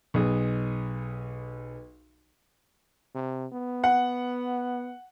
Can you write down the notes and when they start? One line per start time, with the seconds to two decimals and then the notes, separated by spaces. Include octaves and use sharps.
0.14 B1 B3 G#4
3.15 C3
3.52 B3
3.84 F#5